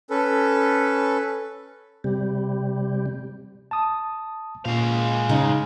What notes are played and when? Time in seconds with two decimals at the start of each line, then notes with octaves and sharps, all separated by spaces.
0.10 C#4 A4 B4
2.04 C3 G3
3.71 A5 D#6
4.66 A#2 G#3 F5
5.29 C#3 C#4 D#4